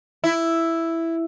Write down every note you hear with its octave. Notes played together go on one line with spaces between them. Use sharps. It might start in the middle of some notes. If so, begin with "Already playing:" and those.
E4